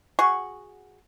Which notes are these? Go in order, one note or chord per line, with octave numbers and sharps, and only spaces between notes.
F#4 G#4 F#5 C#6